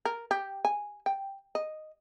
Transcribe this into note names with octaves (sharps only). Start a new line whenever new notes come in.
A#4
G4
G#5
G5
D#5